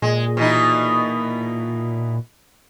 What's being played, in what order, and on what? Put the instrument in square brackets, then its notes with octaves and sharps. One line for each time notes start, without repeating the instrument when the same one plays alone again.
[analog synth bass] A#2 [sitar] G#3
[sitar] B2 E3 D#4